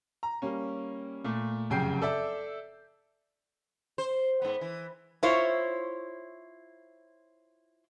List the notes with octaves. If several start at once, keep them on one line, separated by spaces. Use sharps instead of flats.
A#5
G3 A#3 C#4
A#2 A3
F1 F#2 C#3 G5 G6 C7
A4 D5 E5
C5
G#2 B3
E3
E4 F4 C5 C#5